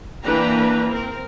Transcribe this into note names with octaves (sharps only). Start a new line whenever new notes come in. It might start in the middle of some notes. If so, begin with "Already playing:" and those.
E3 A#3 D4 B4 G5 A#5
C4 A#4